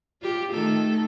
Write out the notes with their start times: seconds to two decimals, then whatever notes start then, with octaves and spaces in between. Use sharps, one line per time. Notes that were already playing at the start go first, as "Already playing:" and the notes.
0.22 F4 G4
0.52 D#3 A3 A4